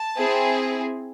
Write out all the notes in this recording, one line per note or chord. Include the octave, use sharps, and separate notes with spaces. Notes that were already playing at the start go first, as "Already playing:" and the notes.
Already playing: A5
C4 E4 G#4